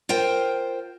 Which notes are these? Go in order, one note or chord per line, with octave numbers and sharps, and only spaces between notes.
F4 A#4 C5 G5